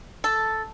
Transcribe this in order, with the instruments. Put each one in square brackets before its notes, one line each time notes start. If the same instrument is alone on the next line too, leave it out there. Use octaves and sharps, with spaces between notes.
[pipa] A4